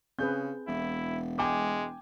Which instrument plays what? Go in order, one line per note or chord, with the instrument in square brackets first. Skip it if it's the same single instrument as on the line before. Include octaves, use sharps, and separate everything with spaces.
[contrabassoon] C#3 [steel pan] C4 G#4 B4 [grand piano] G6
[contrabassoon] E1 [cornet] E4
[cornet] G#3 [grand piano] G5 G#5 D6